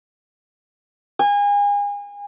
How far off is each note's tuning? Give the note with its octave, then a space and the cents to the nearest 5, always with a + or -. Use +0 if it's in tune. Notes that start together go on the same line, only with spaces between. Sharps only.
G#5 -35